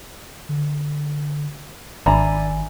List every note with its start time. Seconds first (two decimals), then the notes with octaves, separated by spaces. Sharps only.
0.49 D3
2.06 G#1 D#3 D4 D5 E5 G#5 A#5 B5